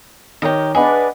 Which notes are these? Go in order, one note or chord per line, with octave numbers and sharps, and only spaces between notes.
D#3 G4 A#4 C#5 D#5
D4 G#4 B4 D#5 F#5 B5 D6